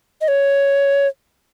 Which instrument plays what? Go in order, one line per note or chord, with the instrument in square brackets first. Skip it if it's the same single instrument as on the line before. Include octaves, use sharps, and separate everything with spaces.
[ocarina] D#5
C#5